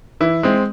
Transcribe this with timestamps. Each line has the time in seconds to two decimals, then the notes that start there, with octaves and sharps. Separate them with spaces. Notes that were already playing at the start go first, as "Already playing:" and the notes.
0.21 E3 E4
0.43 G#3 C4